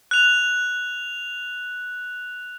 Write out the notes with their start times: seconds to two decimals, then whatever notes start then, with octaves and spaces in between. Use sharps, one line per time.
0.11 F#6 F7